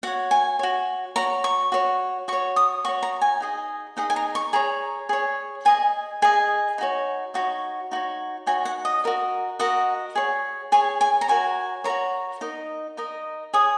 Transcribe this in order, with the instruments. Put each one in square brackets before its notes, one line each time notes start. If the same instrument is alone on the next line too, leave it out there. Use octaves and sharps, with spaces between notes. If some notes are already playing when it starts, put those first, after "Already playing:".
[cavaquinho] F#4 C#5 F#5
G#5
F#4 C#5
F#4 C#5 A#5
C#6
F#4 C#5
F#4 C#6
C#5
D#6
F#4 C#5 C#6
A#5
G#5
D#4 G#4 D#5
D#4 G#4 D#5 F#5
G#5
A#5
C#6
G#4 C#5 A#5
G#4 C#5
G#4 D#5 G#5
G#4 D#5 G#5
D#4 F#4 C#5
D#4 F#4 C#5
D#4 F#4 C#5
D#4 F#4 C#5 G#5
F#5
D#5
F#4 A#4 D#5
F#4 A#4 D#5 F#5
G#4 C#5
G#4 C#5 G#5
G#5
A#5
F#4 A#4 C#5 G#5
A#4 C#5 A#5
F#4
D#4 A#4 D#5
D#4 A#4 D#5
G#4 C#5 D#6